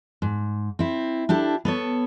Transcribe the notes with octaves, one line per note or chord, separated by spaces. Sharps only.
G#2
C4 E4
D4 E4 G4 A4
B3 A4 C#5